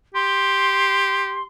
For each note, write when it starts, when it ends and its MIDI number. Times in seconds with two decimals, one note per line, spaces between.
0.14 1.44 67
0.14 1.44 84